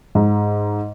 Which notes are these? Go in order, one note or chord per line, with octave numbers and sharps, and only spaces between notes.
G#2